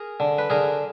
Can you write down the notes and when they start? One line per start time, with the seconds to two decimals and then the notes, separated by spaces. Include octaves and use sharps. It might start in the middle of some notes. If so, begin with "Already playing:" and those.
Already playing: G#4 A#4
0.20 D3
0.38 B4
0.50 D3 G#4 A#4